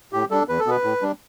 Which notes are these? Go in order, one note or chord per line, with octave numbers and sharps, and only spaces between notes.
A2 G4
G3 D4 A4
E2 B4
A4
B2 B3 B4
A2
G3 D4